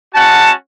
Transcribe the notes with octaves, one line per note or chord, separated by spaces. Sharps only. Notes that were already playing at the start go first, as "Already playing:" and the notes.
G#3 C#4 F#4 F#5 A5